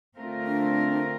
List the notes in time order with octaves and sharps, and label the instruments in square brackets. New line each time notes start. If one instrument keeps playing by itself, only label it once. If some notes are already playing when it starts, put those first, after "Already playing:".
[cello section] D3 A3 C4 F4 A#4
[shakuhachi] D4